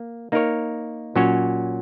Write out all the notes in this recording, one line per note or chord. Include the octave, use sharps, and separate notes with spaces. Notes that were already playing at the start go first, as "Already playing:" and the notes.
Already playing: A#3
A#3 D#4 A#4 C#5
A#2 F#3 C#4 F#4 C#5